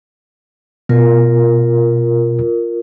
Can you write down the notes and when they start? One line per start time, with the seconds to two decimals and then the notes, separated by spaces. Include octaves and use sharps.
0.89 B2 F4 A#4